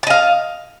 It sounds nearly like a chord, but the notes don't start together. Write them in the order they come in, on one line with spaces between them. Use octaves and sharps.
A5 D#5 F5